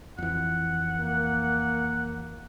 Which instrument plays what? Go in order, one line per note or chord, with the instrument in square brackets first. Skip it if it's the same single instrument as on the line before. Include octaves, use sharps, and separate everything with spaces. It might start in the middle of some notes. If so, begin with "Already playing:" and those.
[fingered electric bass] F2 E3 [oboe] F#5
[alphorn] A#3